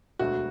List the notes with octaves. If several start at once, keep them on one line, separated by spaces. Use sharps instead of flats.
E1 D2 D3 F#4